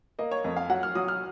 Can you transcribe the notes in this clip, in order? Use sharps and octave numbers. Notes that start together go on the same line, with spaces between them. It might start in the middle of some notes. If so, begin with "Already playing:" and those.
A#3 D#5
C#5
F2 D#5
F5
F#3 F#5
F6
F#3 D#6
F6